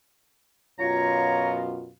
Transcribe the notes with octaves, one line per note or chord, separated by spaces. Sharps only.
F#2 B2 F4 C#5 A#5